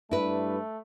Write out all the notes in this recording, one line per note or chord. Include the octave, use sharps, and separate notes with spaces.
G2 A3 D4 E4 B4